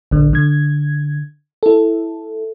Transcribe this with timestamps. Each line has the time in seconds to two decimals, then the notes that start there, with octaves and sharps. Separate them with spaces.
0.11 A#1 D3
0.33 D3 G#6
1.63 E4 A4